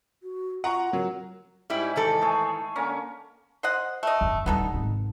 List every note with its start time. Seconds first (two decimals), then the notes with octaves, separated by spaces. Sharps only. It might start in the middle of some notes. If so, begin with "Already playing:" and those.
0.23 F#4
0.64 F4 F#5 A#5 C#6
0.93 F#3 A#4
1.70 G#2 G3 E4 G4
1.96 D#3 E3 A4
2.21 A3 G#4
2.76 D3 A#3 C#4
3.63 C5 D#5 F#5
4.03 A3 D#5
4.21 F#1 E2
4.46 D1 G3 B3 D#4 A4
4.74 G#1